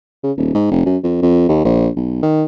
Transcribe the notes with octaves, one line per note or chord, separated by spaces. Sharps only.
C#3
D#1
G#2
F1
F#2
F2
F2
D#2
A#1
B1
D#3